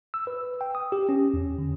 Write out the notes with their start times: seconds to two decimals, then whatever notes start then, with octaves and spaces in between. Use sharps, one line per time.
0.14 E6
0.27 B4
0.61 G5
0.75 D#6
0.92 G4
1.09 C#4
1.34 E2
1.58 D3